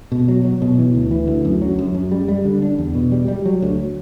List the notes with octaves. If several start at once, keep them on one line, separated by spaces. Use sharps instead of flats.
B2
F#3
F#3
B2
E3
D2
E3
D2
F#2
F#3
F#2
F#2
G3
G3
D3
D4
E2
B2
G3
G3
F#3
D2